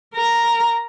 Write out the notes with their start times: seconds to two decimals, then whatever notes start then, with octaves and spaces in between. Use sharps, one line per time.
0.15 A#4 A#5